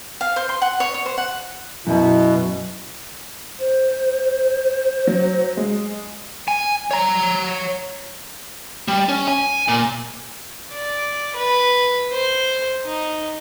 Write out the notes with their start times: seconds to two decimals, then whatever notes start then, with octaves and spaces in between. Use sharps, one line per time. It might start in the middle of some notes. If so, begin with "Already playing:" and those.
0.21 F5
0.36 C5
0.49 C6
0.62 F#5
0.80 C#5
0.94 C#5
1.06 C5
1.18 F#5
1.87 F#2 B2 E4
3.59 C5
5.07 F#3
5.57 G#3
6.48 G#5
6.91 C#5 A#5
8.88 G3
9.09 C#4
9.28 G#5
9.68 A#2
10.73 D5
11.37 B4
12.13 C5
12.86 D#4